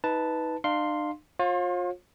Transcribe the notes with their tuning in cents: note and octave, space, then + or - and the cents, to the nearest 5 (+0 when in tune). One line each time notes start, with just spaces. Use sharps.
D#4 +30 B4 +0 A5 +0
D4 +45 F5 +5 C6 +0
F4 +30 C#5 -45